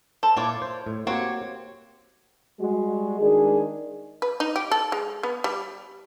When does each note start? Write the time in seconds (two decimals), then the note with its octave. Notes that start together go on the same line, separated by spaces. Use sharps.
0.23 A4 C5
0.37 A#2 E4 F4 C#5 D5
0.62 C5
0.87 A2
1.07 A#3 C4 F#4 G4 C#5
2.60 G3 G#3 F#4
3.19 D#3 G#3 D4 G#4
4.22 B4
4.40 D#4
4.56 G4
4.71 A4
4.92 G#3
5.23 B3
5.44 G3